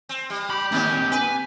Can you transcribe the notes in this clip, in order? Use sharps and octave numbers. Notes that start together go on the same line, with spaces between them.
C4
G3
G4 B5
D#3 A#3 C4 C#4
B4 G#5